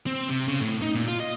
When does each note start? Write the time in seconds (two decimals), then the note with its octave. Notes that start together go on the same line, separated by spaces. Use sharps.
0.06 C4
0.30 C3
0.48 C#3
0.61 A2
0.82 D#4
0.95 A#2
1.08 F4
1.20 D#5